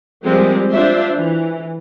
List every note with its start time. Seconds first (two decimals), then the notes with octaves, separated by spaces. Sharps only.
0.24 F3 G3 G#3 A#3 C4
0.70 D4 F4 C5 E5
1.15 E3